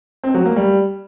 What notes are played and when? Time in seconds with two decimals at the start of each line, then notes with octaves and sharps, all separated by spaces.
0.24 C4
0.34 F#3
0.45 A#3
0.56 G3